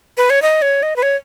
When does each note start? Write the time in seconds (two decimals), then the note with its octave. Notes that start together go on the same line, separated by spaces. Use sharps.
0.17 B4
0.30 C#5
0.42 D#5
0.62 C#5
0.83 D#5
0.96 B4
1.03 C#5